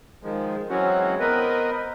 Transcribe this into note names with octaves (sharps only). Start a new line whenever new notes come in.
D#3 F3 G#3
E3 F#3 G#3 C4 C#4 F#4
B3 C4 A#4 B4 D#5